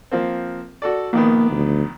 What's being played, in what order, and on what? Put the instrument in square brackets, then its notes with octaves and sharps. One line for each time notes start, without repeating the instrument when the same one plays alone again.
[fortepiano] F3 A#3 C4
F#4 A4 D5
[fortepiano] A#1 D#3 B3 [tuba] A#3
[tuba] D2